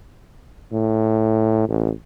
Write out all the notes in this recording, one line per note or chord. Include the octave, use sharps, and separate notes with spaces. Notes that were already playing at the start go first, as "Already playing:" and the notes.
A2
A1